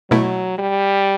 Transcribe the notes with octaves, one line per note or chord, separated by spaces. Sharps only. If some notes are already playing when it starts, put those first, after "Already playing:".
B2 F#3 A3 E4
G3